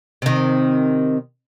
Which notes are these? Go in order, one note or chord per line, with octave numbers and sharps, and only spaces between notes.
C3 D#3